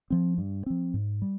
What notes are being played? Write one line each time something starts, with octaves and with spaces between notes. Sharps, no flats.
F3 C4
G2
F3 C4
G#2
G3